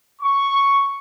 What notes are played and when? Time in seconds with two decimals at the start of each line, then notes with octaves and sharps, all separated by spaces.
0.21 C#6